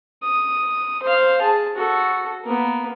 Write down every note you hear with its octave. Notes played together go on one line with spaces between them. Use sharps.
D#6
C5 F5
G#4 A5
F#4 A4
A#3 B3